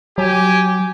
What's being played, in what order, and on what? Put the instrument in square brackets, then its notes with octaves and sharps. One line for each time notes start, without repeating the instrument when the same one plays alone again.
[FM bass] F#3 [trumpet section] G4 G#5